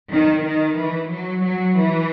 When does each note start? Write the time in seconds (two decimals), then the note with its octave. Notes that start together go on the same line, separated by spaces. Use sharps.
0.12 D#3
0.45 D#3
0.79 E3
1.12 F#3
1.46 F#3
1.79 E3